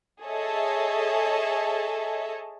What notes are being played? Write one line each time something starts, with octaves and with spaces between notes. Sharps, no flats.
G#4 A4 C#5 D#5 E5 A5